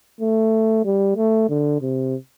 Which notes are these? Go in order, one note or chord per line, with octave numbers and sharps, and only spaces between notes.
A3
G3
A3
D3
C3